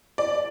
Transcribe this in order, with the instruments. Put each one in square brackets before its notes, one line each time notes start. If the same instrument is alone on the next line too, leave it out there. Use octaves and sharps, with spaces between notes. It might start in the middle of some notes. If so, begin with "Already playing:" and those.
[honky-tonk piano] D5